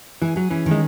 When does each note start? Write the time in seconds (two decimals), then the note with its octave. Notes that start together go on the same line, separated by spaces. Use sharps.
0.22 E3 G#4
0.36 F#3 G#4
0.51 E3 C#4
0.66 D#3
0.71 G#3